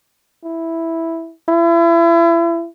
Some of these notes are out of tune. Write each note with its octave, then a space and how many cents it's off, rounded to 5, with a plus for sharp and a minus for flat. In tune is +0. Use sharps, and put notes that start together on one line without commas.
E4 +0
E4 +35